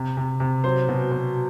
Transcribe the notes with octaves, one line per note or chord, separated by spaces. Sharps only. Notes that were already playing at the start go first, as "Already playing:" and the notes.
Already playing: C3
C3
C3
F#3 C5
B2
B2